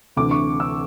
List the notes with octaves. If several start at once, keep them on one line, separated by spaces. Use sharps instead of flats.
D2 C3 E3 D6
C#6
E6